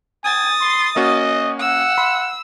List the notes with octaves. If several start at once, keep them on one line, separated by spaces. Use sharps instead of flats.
G#5 D#6 A6
C6
A#3 C#4 F#4 D#5
F#5 E6
B5 C6